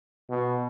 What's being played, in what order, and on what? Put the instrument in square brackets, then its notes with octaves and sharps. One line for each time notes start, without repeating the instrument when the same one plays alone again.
[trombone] B2